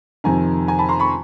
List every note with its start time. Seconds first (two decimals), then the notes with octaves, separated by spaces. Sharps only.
0.24 F2 C3 D#3 G#5 A#5
0.67 G#5 A#5
0.79 A5 B5
0.89 A#5 C6
1.00 B5 C#6